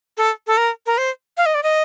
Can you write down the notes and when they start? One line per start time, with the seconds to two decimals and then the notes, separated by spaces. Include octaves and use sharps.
0.17 A4
0.47 A4
0.57 A#4
0.86 A#4
0.98 C5
1.37 F5
1.46 D#5
1.54 D5
1.63 D#5